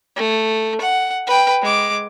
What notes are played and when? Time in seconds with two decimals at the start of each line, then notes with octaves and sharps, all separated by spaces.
0.16 A3
0.81 F#5
1.27 B4 G5
1.62 G#3 D6